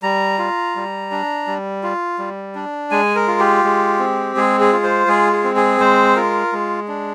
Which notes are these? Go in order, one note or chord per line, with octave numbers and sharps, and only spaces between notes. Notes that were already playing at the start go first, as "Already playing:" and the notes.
G3 A#5
F4
G3
D4
G3
F4
G3
D4
G#3 G#5
A#4
F4
G4
G#3
C4
G#3 G#4
G#4
F4
C5
G#3 G#4
G#4
C4
G#4
G#3 C5
F4 A#4
G#3
D4